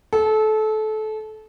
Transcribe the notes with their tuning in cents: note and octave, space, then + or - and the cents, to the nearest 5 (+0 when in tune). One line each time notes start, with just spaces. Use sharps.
A4 -25